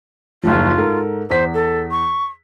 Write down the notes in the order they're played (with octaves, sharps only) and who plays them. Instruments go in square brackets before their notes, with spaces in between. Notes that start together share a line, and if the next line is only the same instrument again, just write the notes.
[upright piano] F#1 D#2 F3 [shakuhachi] F4
[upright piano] G#2 A4 A#4
[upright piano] E2 B6 [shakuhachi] C5
[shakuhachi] A4
C#6